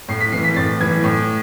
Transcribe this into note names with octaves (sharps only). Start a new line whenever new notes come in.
A2 C7
B6
E3 C7
B6
A2 A6
E3 G#6
A2